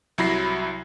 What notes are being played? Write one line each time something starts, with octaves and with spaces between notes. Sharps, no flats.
C2 F#3 E4 B5 A#6 C7